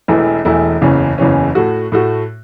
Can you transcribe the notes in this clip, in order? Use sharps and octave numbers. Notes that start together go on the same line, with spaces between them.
E1 E2 E3 A3 E4
E1 E2 E3 A3 E4
F#1 E2 C#3 E3 C#4
F#1 E2 C#3 E3 C#4
A2 A3 F#4
A2 A3 F#4